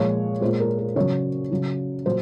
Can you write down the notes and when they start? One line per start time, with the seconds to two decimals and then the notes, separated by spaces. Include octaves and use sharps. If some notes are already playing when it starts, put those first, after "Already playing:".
Already playing: A#2 F3 G#3 C#5
0.41 G#3 C5
0.45 A#2
0.60 A#4
0.79 A#4
0.96 C#3 F#3 C#5
1.51 C#3 F#3
2.05 A#2 F#3 C5